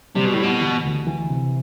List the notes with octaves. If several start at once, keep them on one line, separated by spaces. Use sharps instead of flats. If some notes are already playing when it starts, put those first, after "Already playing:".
C3 G3
B2
A2
B2 G4
E3
D2
E3
C3